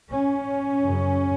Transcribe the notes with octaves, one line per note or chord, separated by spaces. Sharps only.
C#4
F#2 C#3